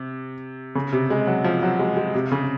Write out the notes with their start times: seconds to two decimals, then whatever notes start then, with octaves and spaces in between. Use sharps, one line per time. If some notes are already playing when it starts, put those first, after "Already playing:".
Already playing: C3
0.75 C#3
0.92 C3
1.10 G#3
1.27 F#3
1.44 F3
1.62 F#3
1.79 G#3
1.97 G#3
2.14 C3
2.32 C#3